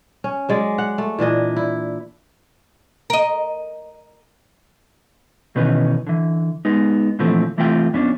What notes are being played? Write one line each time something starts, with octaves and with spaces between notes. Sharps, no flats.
C#4
F#3 G#3 D5
F#5
A3
A#2 E3 D4 D#5
E4
A#4 D#5
B2 D#3 E3 C#4 D#4 B4
D3 E3
G#3 B3 D#4
A#2 D3 E3 F3 A3 C4
C2 E3 A3 C4 F4 G5
F2 B3 C#4 D4